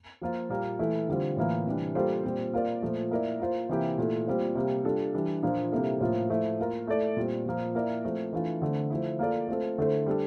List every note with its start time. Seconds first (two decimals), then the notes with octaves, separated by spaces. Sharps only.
0.22 F3 A#3 F4
0.50 A#2 G3 A#3
0.79 E3 A3 E4 A4
1.08 D3 G3 C4 F4
1.36 A2 E3 A#3 F4
1.66 C3 E3 G3 D4
1.95 G3 A#3 F4 A4 C5
2.23 A#2 G3 C4
2.53 A#3 F4 A#4 D5
2.83 A#2 F3 A3
3.11 A#3 E4 A#4 D5
3.40 A#3 F4 C5
3.69 C3 E3 A#3 E4 G4
3.98 A#2 A3 E4 A4
4.27 A#2 G3 C4 F4 C5
4.55 C3 G3 A#3
4.84 G3 D4 F4 A4
5.14 E3 G3 D4
5.43 A#2 F3 A#3 D4
5.72 C3 G3 A#3 E4 A4
6.00 A2 F3 A#3 F4
6.29 F3 A3 E4
6.59 A#3 F4 A#4
6.87 A3 E4 A4 D5
7.17 A#2 G3 C4
7.46 A#2 F3 A#3
7.75 A#3 E4 A#4 D5
8.04 F3 A3 C4
8.33 E3 A3 D4 F4
8.62 D3 A3 C4
8.90 F3 A3 E4
9.19 A#3 F4 A4 D5
9.48 A3 C4 F4 A4
9.78 D3 A3 E4 A4 C5
10.06 G3 D4 A4